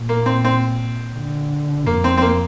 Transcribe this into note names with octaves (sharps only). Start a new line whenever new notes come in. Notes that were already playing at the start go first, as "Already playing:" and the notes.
Already playing: A#2
A#3
C4
C4
D3
F2 A#3
C4
C4
A#3